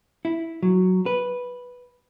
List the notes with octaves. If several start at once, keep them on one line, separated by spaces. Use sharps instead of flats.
E4
F#3
B4